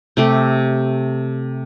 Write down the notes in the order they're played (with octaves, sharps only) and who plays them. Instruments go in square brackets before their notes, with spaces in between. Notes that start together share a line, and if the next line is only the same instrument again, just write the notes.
[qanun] C3 A3 G4